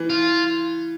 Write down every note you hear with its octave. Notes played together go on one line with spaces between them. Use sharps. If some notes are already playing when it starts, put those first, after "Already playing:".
Already playing: E3
F4